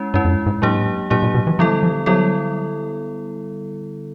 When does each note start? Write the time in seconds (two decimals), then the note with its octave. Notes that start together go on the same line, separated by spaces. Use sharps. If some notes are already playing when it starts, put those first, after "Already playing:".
Already playing: G#3 C#4 E4
0.14 G2 G#3 C#4 E4
0.25 F2
0.30 F#2
0.46 G#2
0.62 A2 F#3 A#3 D4 G4
1.10 A#2 F#3 A#3 D4 G4
1.23 A#2
1.34 B2
1.47 E3
1.59 D3 F3 G3 B3 E4 A4
1.83 F3
2.06 D3 F#3 G3 B3 E4 A4